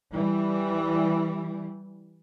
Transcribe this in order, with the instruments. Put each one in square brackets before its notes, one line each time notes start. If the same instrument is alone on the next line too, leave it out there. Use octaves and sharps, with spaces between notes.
[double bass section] E3 G3